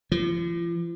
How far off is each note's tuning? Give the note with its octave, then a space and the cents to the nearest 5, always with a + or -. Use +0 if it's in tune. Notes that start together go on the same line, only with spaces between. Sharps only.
F3 -40